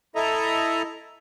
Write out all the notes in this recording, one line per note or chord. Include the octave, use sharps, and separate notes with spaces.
E4 A4 D#5 E5 A#5